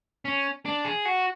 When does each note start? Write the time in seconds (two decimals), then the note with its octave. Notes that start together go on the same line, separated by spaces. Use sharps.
0.25 C#4
0.65 D4
0.85 G#4
1.05 F#4